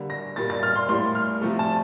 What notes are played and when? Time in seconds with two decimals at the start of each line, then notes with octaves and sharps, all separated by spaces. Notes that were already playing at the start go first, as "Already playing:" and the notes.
Already playing: D3 G3 A#3
0.10 A#6
0.36 A#2 G3 A#3 A6
0.50 A6
0.63 F6
0.76 C6
0.89 A2 G3 A#3 C6
1.15 F6
1.42 C3 F3 A3
1.59 A5